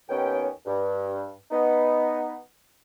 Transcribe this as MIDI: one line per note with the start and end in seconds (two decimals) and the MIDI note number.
0.09 0.48 39
0.09 0.48 59
0.09 0.48 61
0.09 0.48 79
0.66 1.32 43
1.51 2.37 59
1.51 2.37 63